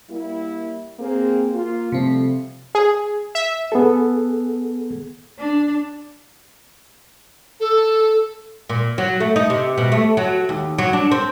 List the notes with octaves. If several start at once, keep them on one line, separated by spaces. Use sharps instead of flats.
G3 A#3 E4
A#3 C4 G#4
A#3 F4
C3 F3 G3 A3 C4
G#4
E5
B3 G#4 A4
D4
A4
A#2
F#3
A3
D#4
C3
B2
A3
F#3
D#2
F#3
D4
C4